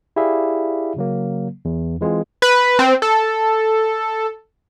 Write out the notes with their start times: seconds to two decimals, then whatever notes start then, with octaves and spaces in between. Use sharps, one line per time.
0.16 E4 G4 G#4 D5 E5 F5
0.96 C#3 F#3 A#3
1.65 E2
2.01 E3 G#3 C4 F4 G#4
2.42 B4
2.79 C4
3.02 A4